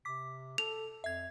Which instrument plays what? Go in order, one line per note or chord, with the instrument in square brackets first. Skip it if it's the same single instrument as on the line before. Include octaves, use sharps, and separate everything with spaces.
[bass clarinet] C3 [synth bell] D6 B6
[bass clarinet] A4 [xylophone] F7
[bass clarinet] F2 [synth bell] E5 G#6